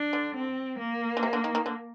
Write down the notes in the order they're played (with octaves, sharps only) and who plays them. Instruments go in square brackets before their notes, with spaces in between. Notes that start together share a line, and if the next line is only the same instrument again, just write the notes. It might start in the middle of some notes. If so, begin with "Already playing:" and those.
Already playing: [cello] D4
[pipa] D3
[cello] C4
A#3
[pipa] D3
C3
D3
D#3
D#3
D3